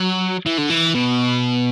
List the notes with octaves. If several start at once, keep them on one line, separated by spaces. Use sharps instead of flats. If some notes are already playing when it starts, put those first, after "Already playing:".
Already playing: F#3
E3
D3
E3
B2